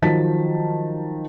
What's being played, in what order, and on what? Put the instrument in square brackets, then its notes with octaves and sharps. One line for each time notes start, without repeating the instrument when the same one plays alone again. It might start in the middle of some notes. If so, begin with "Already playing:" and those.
[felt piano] D#3 F3 F#3 A5 A6 B6